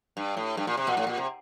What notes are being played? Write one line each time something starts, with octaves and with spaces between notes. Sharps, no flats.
G2
A2
G2
A#2
C3
A#2
A2
A#2
C3